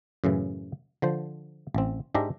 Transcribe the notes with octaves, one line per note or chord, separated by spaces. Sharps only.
F#2 A2 C#3 E3
D3 F3 C5
A1 C4
G#2 G#3 D4 G4 E5 A#5